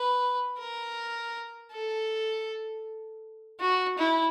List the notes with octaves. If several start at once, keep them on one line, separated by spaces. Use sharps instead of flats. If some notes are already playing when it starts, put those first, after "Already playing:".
Already playing: B4
A#4
A4
F#4
E4